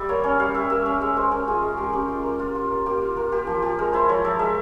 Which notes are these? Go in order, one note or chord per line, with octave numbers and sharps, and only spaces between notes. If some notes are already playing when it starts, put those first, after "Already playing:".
Already playing: G3 E5
A#3 C#5
C#4 C#5
G3 F5
G3 E5
A#3 E5
C#4 F5
G#3 E5
G#3 C5
C#4 A#4
F4 G#4
G#3
G#3 G4
C#4 G4
F4
A#3
F4
F4
A#3
A#3 G4
F4
F4 A#4
A#3 G4
F3 G4
F3 G4
G#3 A#4
E4 C5
F3 C#5
F3 E5
G#3 E5